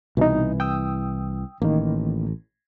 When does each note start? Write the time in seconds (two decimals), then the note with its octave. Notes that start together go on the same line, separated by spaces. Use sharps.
0.17 C2 B2 E3 D#4
0.60 G5 D#6 E6
1.62 A1 D#3 A#3